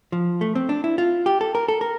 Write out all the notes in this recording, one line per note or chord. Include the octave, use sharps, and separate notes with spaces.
F3
A3
C4
D4
E4
F4
G4
A4
A#4
A4
A#4